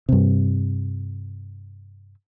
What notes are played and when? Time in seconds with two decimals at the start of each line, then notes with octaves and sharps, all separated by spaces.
0.09 G2 C3